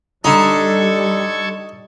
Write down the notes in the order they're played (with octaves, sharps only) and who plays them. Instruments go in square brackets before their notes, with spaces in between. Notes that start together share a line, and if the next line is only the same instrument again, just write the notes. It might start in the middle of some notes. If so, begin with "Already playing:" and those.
[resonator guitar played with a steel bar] D3 A#5 [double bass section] G3 [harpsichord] D#4 [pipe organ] A4 C#6 G#6